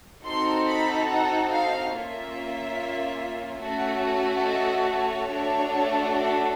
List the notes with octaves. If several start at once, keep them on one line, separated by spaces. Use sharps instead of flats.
C4 D#4 F#4 A4 C6
B5
F#5
F5
A#3 C#4 F4 E5
A3 C#4 F#4 A4
D#5
C#5
A3 D4 F#4 A4